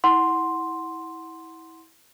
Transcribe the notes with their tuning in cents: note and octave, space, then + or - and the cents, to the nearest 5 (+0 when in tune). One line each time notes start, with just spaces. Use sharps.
E4 -20 F#5 +0 C6 +0